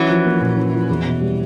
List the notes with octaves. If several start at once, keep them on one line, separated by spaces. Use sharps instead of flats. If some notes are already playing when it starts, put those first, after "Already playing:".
Already playing: E3 F#3 C#4
F3
A#3
A#2
C#4
F3
E2
B2
G3